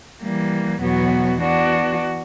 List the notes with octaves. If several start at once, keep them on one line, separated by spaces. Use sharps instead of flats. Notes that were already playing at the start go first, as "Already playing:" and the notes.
E3 G3 A#3
E2 B2 F#3 B3 F#4
E3 B3 D4 F#4